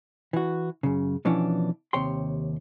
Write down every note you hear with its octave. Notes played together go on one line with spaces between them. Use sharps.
E3 F#4
F#2 C#3
B2 E3 F3 B3 C#4 D4
D#2 C3 C#5 G5 C6